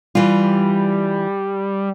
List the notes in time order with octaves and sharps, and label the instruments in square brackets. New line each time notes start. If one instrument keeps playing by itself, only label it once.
[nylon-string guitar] E3 F4 [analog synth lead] G3